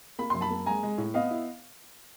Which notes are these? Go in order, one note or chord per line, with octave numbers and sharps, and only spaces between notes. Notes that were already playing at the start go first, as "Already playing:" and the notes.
A#3 B5
F#2 C6
A5 B5
A#3
G#3 G#5 A#5
G#3
A2
B3 D#5 F5
E4